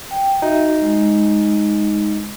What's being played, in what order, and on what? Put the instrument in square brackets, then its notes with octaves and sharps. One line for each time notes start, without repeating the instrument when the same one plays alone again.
[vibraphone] G5
[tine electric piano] D#4 [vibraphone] F#4 E5
[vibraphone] G#3